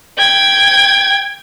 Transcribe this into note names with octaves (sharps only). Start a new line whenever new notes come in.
G5 G#6